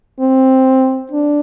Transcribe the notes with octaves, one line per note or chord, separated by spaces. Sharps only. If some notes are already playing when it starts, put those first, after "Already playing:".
C4
D4